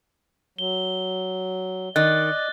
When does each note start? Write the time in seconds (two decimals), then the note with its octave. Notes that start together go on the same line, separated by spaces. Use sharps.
0.58 F#3 G7
1.96 D#3 D5 D#5 F#6 A6